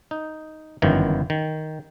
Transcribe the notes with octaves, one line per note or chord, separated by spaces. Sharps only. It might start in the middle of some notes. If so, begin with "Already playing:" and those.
D#4
G1 F#2 D#3 E3
D#3